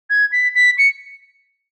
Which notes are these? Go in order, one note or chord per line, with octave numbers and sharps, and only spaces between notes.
G#6
B6
B6
C#7